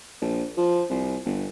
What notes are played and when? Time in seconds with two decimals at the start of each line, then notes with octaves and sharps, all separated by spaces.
0.21 A#1
0.57 F3
0.90 C2
1.25 G1